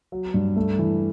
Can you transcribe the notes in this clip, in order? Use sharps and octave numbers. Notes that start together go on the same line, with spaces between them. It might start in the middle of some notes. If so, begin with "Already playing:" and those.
F#3
G2
A3
E3